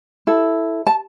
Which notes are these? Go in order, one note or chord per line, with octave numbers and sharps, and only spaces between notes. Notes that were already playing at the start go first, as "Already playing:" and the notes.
E4 A4
A5